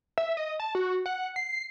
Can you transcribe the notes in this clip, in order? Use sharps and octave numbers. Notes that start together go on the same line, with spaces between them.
E5
D#5
A5
F#4
F#5
C7